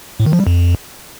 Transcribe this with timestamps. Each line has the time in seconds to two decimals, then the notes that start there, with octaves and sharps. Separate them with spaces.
0.20 A2
0.26 D#3
0.33 F3
0.40 G3
0.47 F2